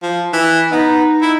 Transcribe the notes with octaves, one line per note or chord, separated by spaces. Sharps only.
F3
E3
B3 D#4
E4